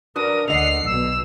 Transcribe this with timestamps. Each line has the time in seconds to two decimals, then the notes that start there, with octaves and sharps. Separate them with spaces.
0.16 D4 F#4 A#4 B4 D#6
0.48 D2 D3 D#5 F#5 C7 F7
0.86 B1 B2 E6